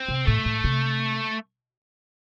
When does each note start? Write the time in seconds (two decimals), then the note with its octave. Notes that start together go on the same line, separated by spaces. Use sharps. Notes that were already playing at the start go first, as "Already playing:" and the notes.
Already playing: C4
0.09 C3
0.27 A2 A3
0.46 A2
0.64 C3